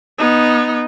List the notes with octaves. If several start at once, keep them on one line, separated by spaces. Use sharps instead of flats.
B3 D#4